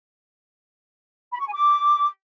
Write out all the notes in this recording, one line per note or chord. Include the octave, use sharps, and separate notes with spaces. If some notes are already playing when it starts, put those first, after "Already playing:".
B5
C#6
G#5
D6